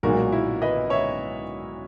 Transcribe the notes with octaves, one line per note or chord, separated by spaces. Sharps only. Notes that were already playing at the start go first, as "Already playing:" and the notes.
B1 A#2 G#3 D#4 F#4 A#4
E4
B4 D#5
C#5 E5